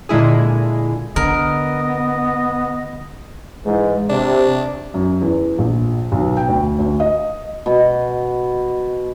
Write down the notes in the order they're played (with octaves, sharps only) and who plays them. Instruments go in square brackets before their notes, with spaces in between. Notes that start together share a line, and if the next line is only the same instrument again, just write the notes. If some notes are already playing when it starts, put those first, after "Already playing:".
[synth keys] A#2 D3 G#3 E4 G#4
[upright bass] D3 [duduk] B3 [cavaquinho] A#4 [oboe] D#5
[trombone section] G#2 E3
[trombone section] C3 [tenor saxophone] D4
[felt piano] F#2
E2
A#1
B1
G5
D2
D2
D#5
[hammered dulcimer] B2 B3